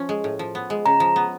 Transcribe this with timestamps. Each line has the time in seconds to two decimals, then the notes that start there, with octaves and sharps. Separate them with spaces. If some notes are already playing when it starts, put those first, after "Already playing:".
Already playing: F3 C#4
0.09 G#3
0.24 A2
0.39 F3
0.55 B3
0.70 G#3
0.86 C#3 A#5
1.00 F3
1.16 B3